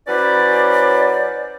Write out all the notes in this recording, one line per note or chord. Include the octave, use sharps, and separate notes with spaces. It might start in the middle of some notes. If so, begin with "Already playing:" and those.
F#3 C#4 E4 B4 C5 D5